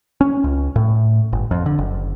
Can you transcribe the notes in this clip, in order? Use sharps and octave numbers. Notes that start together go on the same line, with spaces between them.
C#4
C#2
A2
G1
F2
D3
F#1